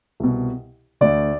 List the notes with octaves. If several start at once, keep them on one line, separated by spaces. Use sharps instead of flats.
C2 B2
D2 D3 D5